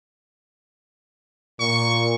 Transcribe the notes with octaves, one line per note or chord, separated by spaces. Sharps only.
A#2 C#6